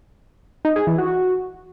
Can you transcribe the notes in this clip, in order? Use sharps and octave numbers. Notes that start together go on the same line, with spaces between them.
D#4
G#4
E3
F#4